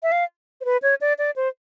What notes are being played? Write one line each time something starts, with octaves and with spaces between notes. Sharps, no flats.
E5
F5
C5
B4
C#5
D5
D5
C5